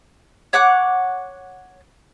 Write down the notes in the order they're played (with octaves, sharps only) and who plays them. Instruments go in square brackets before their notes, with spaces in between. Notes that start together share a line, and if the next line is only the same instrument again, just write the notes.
[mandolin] C#5 F#5 D6 F#6